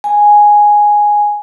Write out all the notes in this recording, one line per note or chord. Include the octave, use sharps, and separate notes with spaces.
G#5